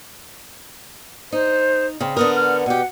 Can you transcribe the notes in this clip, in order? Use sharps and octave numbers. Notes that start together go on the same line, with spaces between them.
D#4 C5
C#3 C4
D3 B3 A#4 D#6
F6
B2 G4 F#5